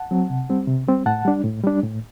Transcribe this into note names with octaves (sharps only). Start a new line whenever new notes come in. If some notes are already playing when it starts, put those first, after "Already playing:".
Already playing: F#5 A5
F#3 C4
C3
G3 C4
C3
G3 C4
A2 F#5 A5
G3 D4
A2
G3 D4
A2